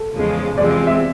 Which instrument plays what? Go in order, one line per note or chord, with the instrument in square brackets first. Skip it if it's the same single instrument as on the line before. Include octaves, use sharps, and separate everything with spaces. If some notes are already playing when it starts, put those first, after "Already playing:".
Already playing: [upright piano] A4
[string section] E2 C#3 F3 G#3
[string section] E2 C3 F3 G#3 C4 [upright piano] D5
[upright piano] E5